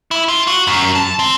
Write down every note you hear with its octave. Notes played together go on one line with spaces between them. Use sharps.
E4
F4
F#4
F#2
A5
C4